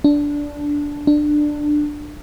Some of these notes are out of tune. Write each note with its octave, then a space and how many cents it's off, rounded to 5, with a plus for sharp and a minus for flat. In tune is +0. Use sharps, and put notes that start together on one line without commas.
D4 -10
D4 +15